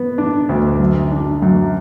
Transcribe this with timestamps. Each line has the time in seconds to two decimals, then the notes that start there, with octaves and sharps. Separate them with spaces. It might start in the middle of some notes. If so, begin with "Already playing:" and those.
Already playing: B3
0.18 D4
0.49 D2
0.79 F#2
1.11 D4
1.42 F#2